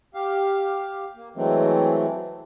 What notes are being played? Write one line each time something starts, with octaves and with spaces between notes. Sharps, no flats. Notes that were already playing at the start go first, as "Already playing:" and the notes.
G4 F5
A#3
E3 F#3 G#3 A3 C4